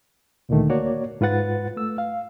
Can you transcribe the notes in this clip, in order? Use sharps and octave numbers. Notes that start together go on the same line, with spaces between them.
D2 A#2 D3 D#3 A3
A#3 F#4 C#5 D5
G#2 F4 B4 F#5 A6
A3 E6
F5